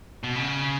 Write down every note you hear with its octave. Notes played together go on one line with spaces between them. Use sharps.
B2
C#3